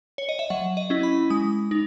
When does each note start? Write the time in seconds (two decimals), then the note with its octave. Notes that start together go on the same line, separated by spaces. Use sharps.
0.18 C#5
0.29 D#5
0.39 E5
0.50 F#3 F#5
0.77 D#5
0.90 C#4 E4
1.03 B5
1.30 G#3 D#6
1.71 D#4